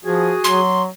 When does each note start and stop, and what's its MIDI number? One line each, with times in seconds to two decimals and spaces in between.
0.05 0.33 53
0.05 0.60 66
0.05 0.60 68
0.05 0.60 80
0.44 0.88 54
0.44 0.82 84